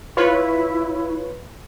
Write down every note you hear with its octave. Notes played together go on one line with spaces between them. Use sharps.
E4 F4 B4 C#5